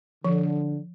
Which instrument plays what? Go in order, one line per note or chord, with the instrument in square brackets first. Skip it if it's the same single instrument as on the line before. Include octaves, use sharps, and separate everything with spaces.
[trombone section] D3 [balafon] F3